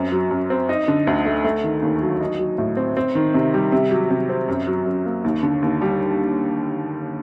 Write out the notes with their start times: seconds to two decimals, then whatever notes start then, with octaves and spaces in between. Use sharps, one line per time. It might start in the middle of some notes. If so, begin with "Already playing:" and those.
Already playing: F#2 C4
0.12 F#3
0.31 F#2
0.50 C4
0.69 D#4
0.88 D3
1.07 D2
1.26 A3
1.44 A3
1.64 D#3
1.82 D#2
2.02 F#3
2.21 D#4
2.39 F#3
2.58 A2
2.77 C4
2.97 C4
3.15 D#3
3.34 C3
3.54 G3
3.72 C3
3.91 F#3
4.10 C3
4.29 C4
4.48 F#2
4.67 F#3
4.86 F#2
5.05 A#3
5.24 D#2
5.43 D3
5.62 D#2
5.81 G3